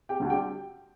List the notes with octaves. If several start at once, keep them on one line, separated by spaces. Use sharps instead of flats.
G4 G5
D2 D3 G3
G4 G5